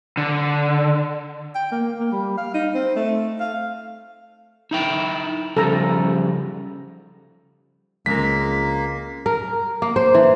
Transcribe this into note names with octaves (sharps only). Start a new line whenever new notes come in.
D3
G5
A#3
A#3
G3
F5
D#4
C4
A3
F5
D#4 E4 G5
C#3 F3 G3 A4 A#5
C#2 G#3 A#3 C4 A#4 B6
A#4
A#3
C5
E3